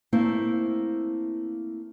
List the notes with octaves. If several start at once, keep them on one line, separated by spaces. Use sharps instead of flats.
A3 A#3 C4 E4 C5